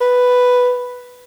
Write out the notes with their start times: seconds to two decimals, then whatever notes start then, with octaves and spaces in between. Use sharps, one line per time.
0.01 B4